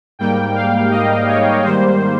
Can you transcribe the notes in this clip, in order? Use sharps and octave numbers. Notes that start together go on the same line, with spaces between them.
G#2 G3 A#3 G5
F5
D#5
C#5
G#2 D#3 G3 A#3 C5